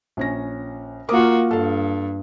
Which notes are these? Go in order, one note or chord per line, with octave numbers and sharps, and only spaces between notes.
A#1 C#4 A#6
A#3 F4 F#4 A#4 D6 D#6
G2 A4 F5